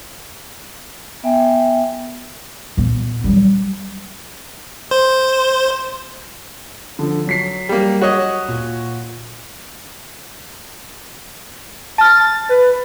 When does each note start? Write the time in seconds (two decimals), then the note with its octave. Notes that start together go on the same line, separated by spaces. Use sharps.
1.23 B3 E5 G5 G#5
2.77 A#2 B3
3.24 F#3 G3
4.91 C5
6.99 D3 F3
7.27 F#3 B6 C7
7.69 G3 A#3
8.01 F#4 C#5 D#5
8.48 A#2
11.98 A5 F6 A6
12.49 B4